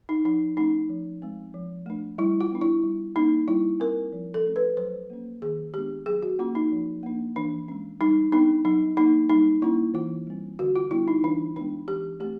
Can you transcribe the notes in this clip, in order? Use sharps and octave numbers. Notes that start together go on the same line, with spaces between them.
D#4
F3 D#4
A3 C#4 D#4
F3
G#3 C4
F3
A3 D4
G3 E4
F4
B3 D4
E4
G3
A#3 C#4 D#4
G3 E4
C4 A#4
F3
A4
A3 C#4
B4
F#3 C5
A#3 C#4
D#3 G#4
G#3 B3 D4 G4
F#3 G#4
F#4
A#3 C#4 F4
D#4
F3
A#3 D4
E3 D4
G#3 C#4
G3 D#4
B3 D4 D#4
F#3 D#4
A#3 D4 D#4
G3 D#4
A#3 C#4 E4
E3 F4
G3 C4
D3 F#4
F4
G3 B3 D4 E4
D#4
E3 D4
G#3 B3 D4
E3 G4
A3 C4 G4